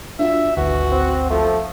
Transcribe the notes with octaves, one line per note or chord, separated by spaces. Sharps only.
D4 F4 F#4 E5
G#1 D2 E3 F#4
C4
F3 A3